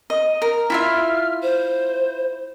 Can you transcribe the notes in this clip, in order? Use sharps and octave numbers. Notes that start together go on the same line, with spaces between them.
D#5
A#4
E4 F4 E5 F6
C5